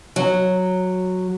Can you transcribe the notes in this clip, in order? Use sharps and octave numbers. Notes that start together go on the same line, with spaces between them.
F#3